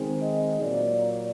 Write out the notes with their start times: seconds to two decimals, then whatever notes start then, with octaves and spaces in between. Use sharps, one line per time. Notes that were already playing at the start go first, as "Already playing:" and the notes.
Already playing: D#3 G#3 C4
0.21 D#5
0.60 A#2 F#3 A#3 D5
1.02 D5